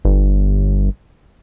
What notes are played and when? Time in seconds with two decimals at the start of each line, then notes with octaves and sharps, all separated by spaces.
0.05 G1